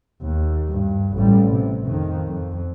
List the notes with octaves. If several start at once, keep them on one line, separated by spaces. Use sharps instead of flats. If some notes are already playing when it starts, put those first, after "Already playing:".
D#2
G2
A1 G3
C3
F2 D#3
F2